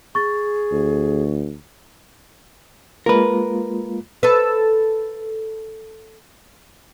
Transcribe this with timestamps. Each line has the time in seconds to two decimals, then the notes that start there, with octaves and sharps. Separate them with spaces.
0.15 G#4 C#6 A6
0.72 D2
3.06 G#3 A#3 F4 A#4 B4
4.23 A4 B4